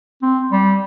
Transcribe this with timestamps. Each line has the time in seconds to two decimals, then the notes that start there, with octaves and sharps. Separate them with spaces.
0.22 C4
0.52 G3